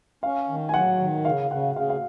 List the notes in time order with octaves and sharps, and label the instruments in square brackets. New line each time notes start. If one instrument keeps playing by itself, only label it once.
[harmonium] C#4 [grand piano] F5
[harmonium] D#3
[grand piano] G#5
[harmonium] F#3 [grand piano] F#5
[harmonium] D#3
[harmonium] C#3 [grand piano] F5
[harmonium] C#3 [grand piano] F#5
[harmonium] C#3 [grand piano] F5
[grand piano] F5